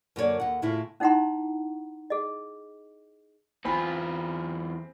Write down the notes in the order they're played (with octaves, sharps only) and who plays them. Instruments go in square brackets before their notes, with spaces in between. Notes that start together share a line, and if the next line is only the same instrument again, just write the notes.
[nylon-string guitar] F#2 D3 A#3 F#4 C#5 D5
D#2 F#5
A2 C#3 A3 E4 F4
[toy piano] C#4 D#4 E4 F#5 A#5 C6
G#4 D#5
[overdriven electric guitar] E2 F4 [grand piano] C4 G#5 B5